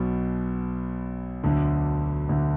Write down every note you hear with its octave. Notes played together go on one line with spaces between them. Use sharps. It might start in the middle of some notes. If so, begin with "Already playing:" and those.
Already playing: B1 B2
D2 D3
D2 D3